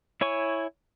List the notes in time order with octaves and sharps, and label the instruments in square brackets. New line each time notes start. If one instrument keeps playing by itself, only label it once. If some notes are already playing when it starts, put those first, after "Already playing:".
[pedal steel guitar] E4 C#5 G#5 C#6